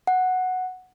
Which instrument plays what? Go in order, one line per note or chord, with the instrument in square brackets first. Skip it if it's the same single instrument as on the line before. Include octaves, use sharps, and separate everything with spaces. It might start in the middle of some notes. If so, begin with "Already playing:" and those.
[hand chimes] F#5